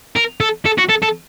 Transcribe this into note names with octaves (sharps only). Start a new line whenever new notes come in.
A#4
A4
A4
F#4
A4
A4